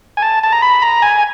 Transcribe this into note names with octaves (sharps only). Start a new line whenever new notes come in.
G#5
A5
A5
A#5
B5
A#5
G#5